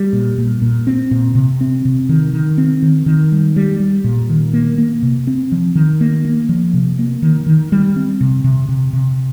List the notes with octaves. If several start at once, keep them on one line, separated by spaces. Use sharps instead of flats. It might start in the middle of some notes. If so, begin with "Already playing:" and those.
Already playing: G3
A#2
A#2
A#2
C4
A#2
C3
C4
C3
D#3
D#3
C4
D#3
D#3
G3
G3
G3
A#2
D#3
A#3
A#3
C3
C4
F3
D#3
A#3
A#3
F3
C3
A#3
D#3
D#3
G3
C4
C3
C3
C3
C3